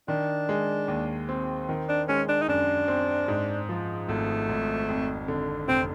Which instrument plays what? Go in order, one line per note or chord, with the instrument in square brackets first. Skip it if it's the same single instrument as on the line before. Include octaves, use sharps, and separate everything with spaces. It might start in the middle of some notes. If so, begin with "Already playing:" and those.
[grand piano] D#3 [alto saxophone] D4
[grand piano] G#3
D#2
C4
D#3
[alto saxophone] D4
[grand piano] G#3 [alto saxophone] C#4
[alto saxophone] D4
D#4
[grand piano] F#2 [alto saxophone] D4
[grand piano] C4
G#2
F3
[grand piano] G#1 [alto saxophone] A3
[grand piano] G#1
F2
D3
[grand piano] F1 [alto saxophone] C4